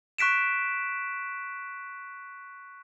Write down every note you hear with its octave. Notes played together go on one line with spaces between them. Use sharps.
C#6 F#6 B6 D7 E7